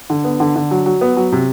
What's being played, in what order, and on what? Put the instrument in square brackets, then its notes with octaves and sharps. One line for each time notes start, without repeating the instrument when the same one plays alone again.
[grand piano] D3
B3
D3
D3
F#3
F#3
B3
F#3
C3